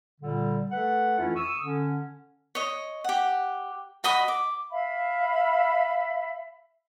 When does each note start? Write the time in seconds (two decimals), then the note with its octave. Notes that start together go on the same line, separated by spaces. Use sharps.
0.21 A#2 D3 G3
0.71 A3 A4 B4 F#5
1.17 F2 E3 A3 C#4 E4 F4
1.34 C#6 D#6 E6
1.63 D3 C#4
2.55 C#5 D#5
3.04 G4 F#5
4.04 F#4 D#5 B5 D#6
4.28 D6
4.70 E5 F5 B5